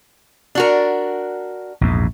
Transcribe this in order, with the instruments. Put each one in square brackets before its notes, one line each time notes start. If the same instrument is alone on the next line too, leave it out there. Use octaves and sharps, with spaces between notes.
[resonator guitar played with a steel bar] D4 F#4 A#4
[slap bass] A#1 E2 G#2